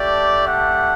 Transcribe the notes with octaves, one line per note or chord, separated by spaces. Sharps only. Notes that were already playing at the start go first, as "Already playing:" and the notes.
Already playing: A3 D4 G4 D5
F#5